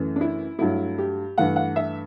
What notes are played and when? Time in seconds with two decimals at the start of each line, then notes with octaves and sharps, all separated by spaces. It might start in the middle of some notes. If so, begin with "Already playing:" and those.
Already playing: F#2 E3 A3
0.16 D4
0.21 E4
0.59 G2 F#3 A3 E4
0.98 G4
1.38 G2 E3 A3 F#5
1.56 F#5
1.76 E5